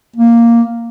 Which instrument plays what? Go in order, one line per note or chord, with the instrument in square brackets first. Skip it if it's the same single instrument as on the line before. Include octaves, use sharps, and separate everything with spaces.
[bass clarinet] A#3